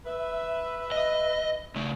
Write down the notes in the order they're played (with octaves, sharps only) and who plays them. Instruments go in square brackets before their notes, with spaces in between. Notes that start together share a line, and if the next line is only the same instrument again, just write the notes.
[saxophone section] B4 E5
[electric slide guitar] D#5
C#3 A3